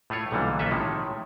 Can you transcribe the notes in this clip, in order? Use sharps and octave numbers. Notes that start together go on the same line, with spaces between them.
A2 A3 F4 C#5
B1 A#2 D3 E3 G3
B1 A#3 C#4 A4 B4 E5
A2 C3 D#3 F3 G#3